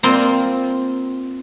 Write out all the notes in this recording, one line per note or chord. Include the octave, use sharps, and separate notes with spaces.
A#3 C4 F4